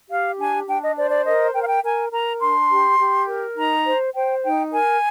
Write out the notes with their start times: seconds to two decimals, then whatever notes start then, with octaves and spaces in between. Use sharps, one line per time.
0.10 G4 F5
0.39 D4 G#5
0.67 D4 G5
0.82 D#5
0.96 C5 D5
1.11 D5
1.25 A#4 D#5
1.54 A#4 G5
1.62 F5
1.69 G5
1.83 A#4 G#5
2.12 A#4 A#5
2.41 D4 C6
2.70 G4
2.99 G4
3.27 A#4
3.56 D#4 A#5
3.85 C5
4.14 C5 G5
4.43 D#4 G5
4.72 A#4 G#5